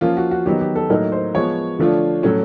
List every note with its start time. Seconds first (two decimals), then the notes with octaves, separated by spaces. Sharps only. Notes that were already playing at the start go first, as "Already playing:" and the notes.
0.01 F3 A#3 C#4 F4
0.17 F#4
0.31 F#4
0.46 D#3 F#3 B3 D#4 G4
0.61 G4
0.76 A4
0.90 A2 F#3 A#3 D#4 A#4
1.12 C5
1.35 F3 G#3 B3 C#5
1.79 D3 F3 A3 D4 F4
2.23 A2 F#3 A3 C#4